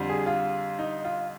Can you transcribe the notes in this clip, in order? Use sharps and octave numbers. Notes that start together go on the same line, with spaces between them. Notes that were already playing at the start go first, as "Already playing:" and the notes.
Already playing: F2 D3 G3
G#4
F4
D#4
F4